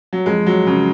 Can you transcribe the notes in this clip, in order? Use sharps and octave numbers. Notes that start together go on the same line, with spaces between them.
F#3
F2 G#3
F#3
C#3